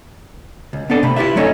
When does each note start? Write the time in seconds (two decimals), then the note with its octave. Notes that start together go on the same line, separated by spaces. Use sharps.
0.73 C#2
0.90 B3 C4 D4 A4 D5 D#5
1.03 C3 A3 B5
1.16 E4 F4 G4 B4 E5
1.36 F#3 A3 C#4 D#4 A4 D#5